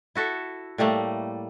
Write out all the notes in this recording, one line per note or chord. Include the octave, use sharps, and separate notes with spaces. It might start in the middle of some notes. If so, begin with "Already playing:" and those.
E4 F#4 A4 E5
A2 G3 A3 A#3